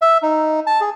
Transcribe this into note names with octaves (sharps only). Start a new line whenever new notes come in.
E5
D#4
A5
G#4